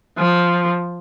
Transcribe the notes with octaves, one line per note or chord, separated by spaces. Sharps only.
F3